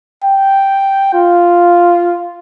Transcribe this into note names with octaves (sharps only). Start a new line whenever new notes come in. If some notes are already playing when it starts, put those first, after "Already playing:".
G5
F4